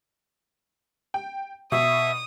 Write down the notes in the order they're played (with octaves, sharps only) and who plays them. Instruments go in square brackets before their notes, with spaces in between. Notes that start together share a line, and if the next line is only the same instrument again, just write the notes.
[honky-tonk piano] G5
[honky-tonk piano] B2 [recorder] E5 [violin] D#6